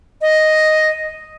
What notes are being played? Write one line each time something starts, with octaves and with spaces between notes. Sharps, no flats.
D#5